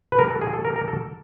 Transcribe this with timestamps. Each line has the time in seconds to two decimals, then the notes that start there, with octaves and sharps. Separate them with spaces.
0.12 B4
0.19 A#4
0.30 A4
0.41 G#4
0.53 A4
0.65 A#4
0.76 A#4
0.88 A4